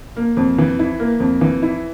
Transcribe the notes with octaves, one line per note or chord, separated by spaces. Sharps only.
A#3
F2
E3
E4
A#3
F2
E3
E4